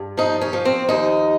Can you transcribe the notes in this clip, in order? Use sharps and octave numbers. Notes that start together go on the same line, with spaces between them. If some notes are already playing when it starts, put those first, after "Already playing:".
Already playing: G2
F3 D#4
C#4
F3
C4
D#2 D#4